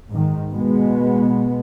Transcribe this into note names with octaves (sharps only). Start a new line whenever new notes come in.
G#2 D#3
B2 G#3 B3